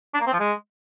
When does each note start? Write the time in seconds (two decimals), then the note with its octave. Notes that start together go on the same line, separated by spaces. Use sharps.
0.14 D4
0.21 A#3
0.27 C4
0.33 F3
0.40 G#3